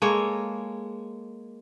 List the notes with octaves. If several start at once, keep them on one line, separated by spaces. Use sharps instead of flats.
G#3 A#3 A4 C#5